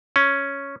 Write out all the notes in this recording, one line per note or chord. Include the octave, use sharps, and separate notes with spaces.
C#4